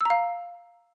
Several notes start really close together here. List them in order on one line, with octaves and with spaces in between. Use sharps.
E6 A#5 F5